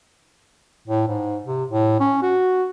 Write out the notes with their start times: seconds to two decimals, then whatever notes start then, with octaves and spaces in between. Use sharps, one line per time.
0.88 A2
1.08 G#2
1.44 C3
1.70 A2
2.00 C#4
2.22 F#4